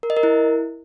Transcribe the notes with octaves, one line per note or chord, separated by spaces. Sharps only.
A#4
D#5
A#4
E4